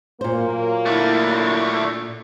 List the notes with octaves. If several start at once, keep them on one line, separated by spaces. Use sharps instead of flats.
A#2 F#3 A#3 C5
D3 A3 E4